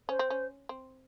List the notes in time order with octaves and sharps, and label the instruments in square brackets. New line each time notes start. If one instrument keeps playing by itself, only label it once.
[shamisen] C#4 [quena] C5
[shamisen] C4
C#4
C4